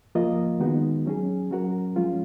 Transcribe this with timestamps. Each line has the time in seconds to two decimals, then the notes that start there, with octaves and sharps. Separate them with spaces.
0.15 F3 A#3 F4 A#4 D#5
0.60 D#3 G#3 B3 D#4 F#4
1.06 F#3 C#4 G#4
1.51 F#3 C#4 F#4 A#4
1.96 F3 G#3 C#4 F4